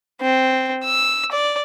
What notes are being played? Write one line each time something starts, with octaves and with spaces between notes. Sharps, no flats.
C4
E6
D5